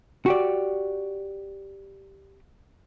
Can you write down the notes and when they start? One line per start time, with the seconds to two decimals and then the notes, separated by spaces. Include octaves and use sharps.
0.26 F#4 G4 D5